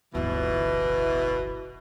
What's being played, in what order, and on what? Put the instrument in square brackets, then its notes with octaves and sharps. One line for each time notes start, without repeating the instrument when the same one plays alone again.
[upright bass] D1 G1 [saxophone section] B2 E3